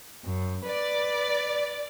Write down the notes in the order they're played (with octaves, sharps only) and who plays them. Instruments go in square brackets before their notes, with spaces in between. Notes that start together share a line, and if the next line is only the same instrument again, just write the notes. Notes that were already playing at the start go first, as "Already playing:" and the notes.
[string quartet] F#2
[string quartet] B4 [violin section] D5